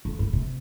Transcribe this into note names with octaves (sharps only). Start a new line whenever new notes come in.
F2
G2
C3